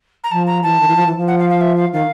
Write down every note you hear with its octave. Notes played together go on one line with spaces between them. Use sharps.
A#5
F3 A5
A#5
E3 A5
D#3
E3
F3
E3
F3
F#5
F5
F5
E5
F5
D#3 F5